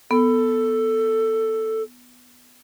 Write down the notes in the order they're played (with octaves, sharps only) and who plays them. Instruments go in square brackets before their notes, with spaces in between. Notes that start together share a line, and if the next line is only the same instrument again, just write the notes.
[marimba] B3 [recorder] A4